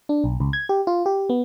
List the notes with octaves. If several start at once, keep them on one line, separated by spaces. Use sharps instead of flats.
D4
B1
C#2
G#6
G4
F4
G4
B3